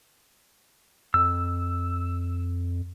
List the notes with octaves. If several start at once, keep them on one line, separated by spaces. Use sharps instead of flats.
F2 E6